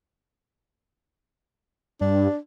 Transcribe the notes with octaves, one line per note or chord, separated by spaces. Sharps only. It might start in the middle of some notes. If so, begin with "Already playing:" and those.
G2 D4